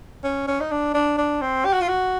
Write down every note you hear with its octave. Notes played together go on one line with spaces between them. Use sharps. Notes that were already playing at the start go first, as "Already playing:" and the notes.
C#4
C#4
D#4
D4
D4
D4
C4
G4
F#4
F4
F#4